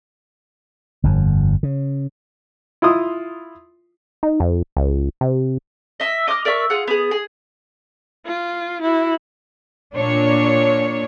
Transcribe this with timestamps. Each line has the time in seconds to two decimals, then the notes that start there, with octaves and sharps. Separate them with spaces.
1.04 G1 F2
1.63 C#3
2.82 E4 F4 C6 D#6
4.23 D#4
4.40 F2
4.77 C#2
5.21 C3
6.00 D#5 E5
6.28 D#5 D6 D#6 F6
6.45 A#4 D5 E5 C#6
6.70 F4 G#4 F#5
6.87 B3 G#4
7.11 G#4
8.26 F4
8.81 E4 F#4
9.96 A#2 D4 C#5